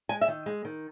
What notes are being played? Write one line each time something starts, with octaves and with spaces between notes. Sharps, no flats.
G#3 G#5
E5
D#3
G#3
D#3